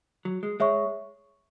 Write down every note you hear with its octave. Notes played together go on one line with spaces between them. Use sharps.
F#3
G#3
G#3 C#5 E5 C#6